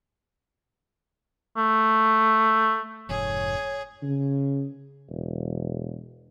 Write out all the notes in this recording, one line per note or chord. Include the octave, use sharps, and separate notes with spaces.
A3
F1 F2 G#2 G#4 C#5
C#3
E1